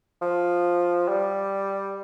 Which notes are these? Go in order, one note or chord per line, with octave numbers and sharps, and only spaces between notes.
F3
G3